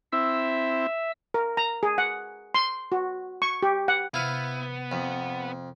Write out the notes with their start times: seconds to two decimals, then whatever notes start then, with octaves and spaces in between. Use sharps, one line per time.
0.13 C4 E4 E5 E6
1.34 A#4
1.57 A#5
1.83 G#4
1.98 F#5
2.54 C6
2.92 F#4
3.42 C#6
3.63 G4
3.88 F#5
4.14 C3 B3 E4 F5
4.92 F2